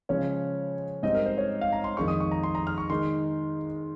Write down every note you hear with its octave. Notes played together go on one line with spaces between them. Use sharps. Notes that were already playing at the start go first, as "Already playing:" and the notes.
C#3 F3 G#3 C#4 C#5
G#2 G3 C4 D#4 D#5
A#4
C5
C#5
F5
A#5
C6
F2 D#3 G#3 D#4 C#6
D#6
C#6
A#5
C6
A#5
F6
C#6
D#3 G#3 D#4 C6